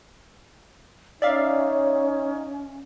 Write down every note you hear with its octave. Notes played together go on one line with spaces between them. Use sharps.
C#4 D#4 C#5 D5 E5 F5